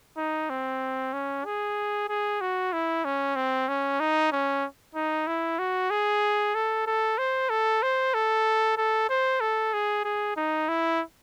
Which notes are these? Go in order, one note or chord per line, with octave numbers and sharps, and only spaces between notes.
D#4
C4
C#4
G#4
G#4
F#4
E4
C#4
C4
C#4
D#4
C#4
D#4
E4
F#4
G#4
A4
A4
C5
A4
C5
A4
A4
C5
A4
G#4
G#4
D#4
E4